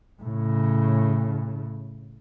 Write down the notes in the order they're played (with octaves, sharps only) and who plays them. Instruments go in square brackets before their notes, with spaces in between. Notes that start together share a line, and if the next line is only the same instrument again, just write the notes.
[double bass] A2 C#3